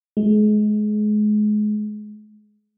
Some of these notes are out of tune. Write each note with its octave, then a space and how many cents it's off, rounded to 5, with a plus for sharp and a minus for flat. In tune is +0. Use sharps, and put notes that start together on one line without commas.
G#3 +30